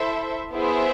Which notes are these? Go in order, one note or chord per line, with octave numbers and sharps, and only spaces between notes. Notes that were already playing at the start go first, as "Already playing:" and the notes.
Already playing: E4 A4 C5 E5
B3 E4 G#4 C5 E5